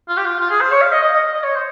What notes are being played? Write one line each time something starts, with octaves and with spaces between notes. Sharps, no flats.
F4
G4
F4
F4
G#4
C5
C#5
F5
D#5
D#5
D#5
D#5
C#5
C5